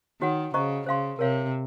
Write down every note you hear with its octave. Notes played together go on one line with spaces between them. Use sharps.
D#3 F#4 C#5 F#5
C#3 C5 D#5 A#5 C#6
C#3 C5 F5 C6
C3 A#4 C#5 F5